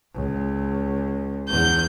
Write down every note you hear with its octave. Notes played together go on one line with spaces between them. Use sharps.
C#2
E2 G6